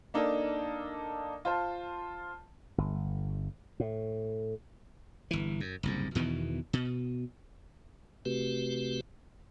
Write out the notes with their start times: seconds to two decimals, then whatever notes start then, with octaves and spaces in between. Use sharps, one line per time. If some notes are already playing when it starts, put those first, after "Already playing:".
0.14 A#3 D4 D#4 A4
1.45 F4 C5 A5
2.78 G1
3.80 A2
5.31 G1 E3
5.60 F#2
5.83 F#1 C2 G#2
6.15 E2 B2 D#3 E3
6.73 B2
8.25 C3 A3 C4 F#4 G4 B4